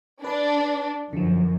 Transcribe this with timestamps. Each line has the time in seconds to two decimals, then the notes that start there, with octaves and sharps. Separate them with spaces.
0.24 D4 B4 A5
1.13 F#2 D3 F3